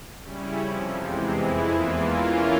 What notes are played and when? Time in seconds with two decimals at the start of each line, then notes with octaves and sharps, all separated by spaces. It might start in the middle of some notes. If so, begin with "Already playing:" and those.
0.22 C#3 G3 C#4 E4
0.59 F2 C3 F3
0.95 E2 C3 E3 G#3 C4
1.32 F2 E3 G#3 E4
1.69 E2 E3 A#3 F4
2.06 E3 A#3 C#4 F4